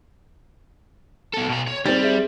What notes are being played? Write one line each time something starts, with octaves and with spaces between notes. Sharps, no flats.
B2 A4
B2 A#5
C#5
G3 C4 D#4 G4 G#4 A6
G#4 E5